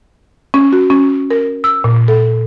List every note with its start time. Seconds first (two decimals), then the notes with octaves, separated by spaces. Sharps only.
0.54 C#4
0.73 F#4
0.90 C#4
1.31 A#4
1.64 E6
1.84 A#2
2.08 A4